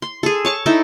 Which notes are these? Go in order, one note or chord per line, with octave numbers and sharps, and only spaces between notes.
C6
G#4 A4
C#5 A5 C#6
D#4 E4 A4 G5